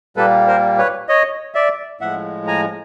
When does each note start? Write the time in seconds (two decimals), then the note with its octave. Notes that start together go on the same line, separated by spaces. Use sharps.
0.17 A#2 G3 A#3 A4 B4
0.47 A#4 C5
0.78 B4 C#5
1.09 C#5 D#5
1.55 D5 E5
2.01 A2 F3 G#3 E5 F#5
2.47 G#5 A#5